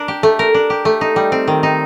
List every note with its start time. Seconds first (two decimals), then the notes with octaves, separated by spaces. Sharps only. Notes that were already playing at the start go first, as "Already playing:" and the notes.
Already playing: D4 A#4
0.08 G4
0.23 A3
0.39 A#4
0.54 D4
0.70 G4
0.85 A3
1.01 D#4
1.16 G3
1.32 C4
1.48 D#3
1.63 D#4